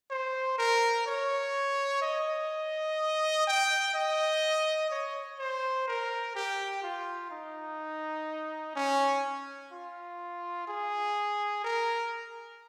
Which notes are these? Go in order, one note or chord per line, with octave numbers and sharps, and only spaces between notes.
C5
A#4
C#5
D#5
G5
D#5
C#5
C5
A#4
G4
F4
D#4
C#4
F4
G#4
A#4